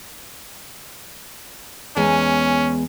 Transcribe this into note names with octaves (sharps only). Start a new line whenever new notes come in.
E2 G#3 C#4 G#5